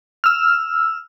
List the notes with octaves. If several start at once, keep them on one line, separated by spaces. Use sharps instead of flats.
E6 F6